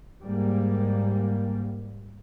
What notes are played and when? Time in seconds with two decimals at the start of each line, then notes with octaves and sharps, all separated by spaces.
0.23 G#2 G3 A#3